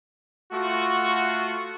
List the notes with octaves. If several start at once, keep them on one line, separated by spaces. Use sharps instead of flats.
A3 F4 F#4